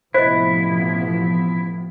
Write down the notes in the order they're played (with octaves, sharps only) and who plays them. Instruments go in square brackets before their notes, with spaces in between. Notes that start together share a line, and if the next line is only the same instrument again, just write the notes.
[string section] A1 [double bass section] C3 F3 B3 [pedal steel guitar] E4 [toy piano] C5 D#5